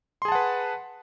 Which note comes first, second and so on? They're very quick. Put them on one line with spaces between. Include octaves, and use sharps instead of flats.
C6 G#4 A5 F#5 B4